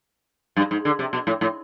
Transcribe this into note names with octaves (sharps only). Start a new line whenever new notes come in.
G2
G#2
D3
C3
B2
A2
A2